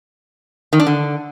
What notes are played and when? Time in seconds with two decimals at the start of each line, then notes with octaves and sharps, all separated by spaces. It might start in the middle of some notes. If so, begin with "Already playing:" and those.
0.73 D#3
0.80 D4
0.87 D3